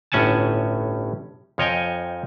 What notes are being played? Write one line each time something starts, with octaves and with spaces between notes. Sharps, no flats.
G1 A2 C#4 F#5 G#5 A5
F2 F3 C#5 D#5 G5 G#5